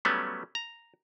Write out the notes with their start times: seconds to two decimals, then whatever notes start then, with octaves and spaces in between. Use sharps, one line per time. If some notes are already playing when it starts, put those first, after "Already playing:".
0.05 F#3 G3 A3 B3 C#4
0.55 A#5